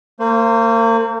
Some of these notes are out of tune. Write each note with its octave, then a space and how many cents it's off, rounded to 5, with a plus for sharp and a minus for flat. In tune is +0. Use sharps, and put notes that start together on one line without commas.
A#3 -35 C5 +0